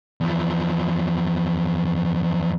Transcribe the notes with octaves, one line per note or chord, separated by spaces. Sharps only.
E2 F3